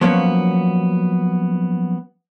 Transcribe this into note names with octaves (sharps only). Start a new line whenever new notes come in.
F3 F#3 A#3 B3 C#4